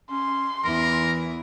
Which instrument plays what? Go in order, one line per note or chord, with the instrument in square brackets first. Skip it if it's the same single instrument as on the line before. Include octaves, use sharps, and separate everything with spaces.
[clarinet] C#4 [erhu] C6
[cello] E2 E4 [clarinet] E3 [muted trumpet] A#4